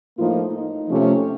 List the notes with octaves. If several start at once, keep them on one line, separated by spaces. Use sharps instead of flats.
A2 F3 A#3 D#4 F4
D#4
C3 F3 A3 C#4